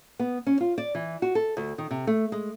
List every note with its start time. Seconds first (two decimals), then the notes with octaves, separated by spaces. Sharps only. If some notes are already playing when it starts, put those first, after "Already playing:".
0.19 B3
0.47 C#4
0.61 F4
0.78 D5
0.95 E3
1.22 F#4
1.35 A4
1.57 D2
1.78 D#3
1.91 C3
2.07 A3
2.32 G#3